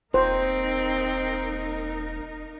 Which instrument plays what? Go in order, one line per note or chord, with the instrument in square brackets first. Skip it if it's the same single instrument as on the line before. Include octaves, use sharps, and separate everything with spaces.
[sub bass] E1 [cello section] A#3 D#4 A#4 [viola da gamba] C4 [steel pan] C5